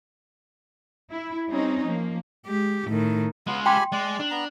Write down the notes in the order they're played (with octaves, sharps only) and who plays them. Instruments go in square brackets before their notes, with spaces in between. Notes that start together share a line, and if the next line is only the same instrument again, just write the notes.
[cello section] E4
G3 C4 C#4 D#4
F3 A#3
[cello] G#3 G4
A2 D#3
[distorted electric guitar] G#3 F4 [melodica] B3
[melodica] G4 G#5 B5 [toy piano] G5 C6
[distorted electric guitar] G#3 [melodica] D5
[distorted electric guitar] D4
[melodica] B3 A#5